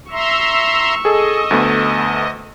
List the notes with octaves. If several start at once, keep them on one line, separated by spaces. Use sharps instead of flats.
E5 A#5 C6 C#6 E6
G#4 A4 D#5
D2 A3 B3